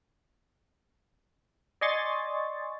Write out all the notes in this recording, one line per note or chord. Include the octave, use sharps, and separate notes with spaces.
D5 D#5 G#5 C6 C#6 A6